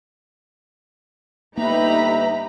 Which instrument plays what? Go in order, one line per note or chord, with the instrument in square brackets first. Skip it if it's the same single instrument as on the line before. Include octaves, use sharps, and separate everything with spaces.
[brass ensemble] G1 E5 [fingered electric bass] A#3 [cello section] D#4 G4 B4 [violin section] A#5 B5